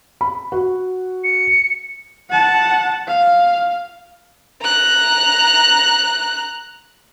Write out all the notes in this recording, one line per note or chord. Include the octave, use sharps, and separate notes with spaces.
B5
F#4
C#7
F#5 A5
F5
A#5 F#6